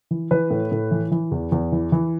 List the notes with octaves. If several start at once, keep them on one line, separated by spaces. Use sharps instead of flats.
E3
E3 B4
A2
A2
E3
E3
E2
E2
E3
E3